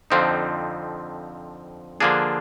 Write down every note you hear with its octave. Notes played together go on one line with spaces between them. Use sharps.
F2 D3 F3 C4 D#4
D3 F3 A#3 D4 G#4